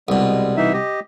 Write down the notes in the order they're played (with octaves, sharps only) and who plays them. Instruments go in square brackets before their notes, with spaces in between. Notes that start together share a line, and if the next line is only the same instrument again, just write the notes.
[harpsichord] C2 B2 [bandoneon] G3 G#3
[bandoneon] E3 D#4 E5
G4 D#5